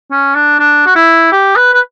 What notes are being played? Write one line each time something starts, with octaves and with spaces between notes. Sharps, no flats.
C#4
D4
D4
F#4
E4
G4
B4
B4